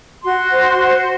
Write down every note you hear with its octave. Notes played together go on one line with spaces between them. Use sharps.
F#4 C6
C5
F#4